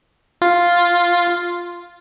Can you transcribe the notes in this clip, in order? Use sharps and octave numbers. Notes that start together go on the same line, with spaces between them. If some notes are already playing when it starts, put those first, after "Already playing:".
F4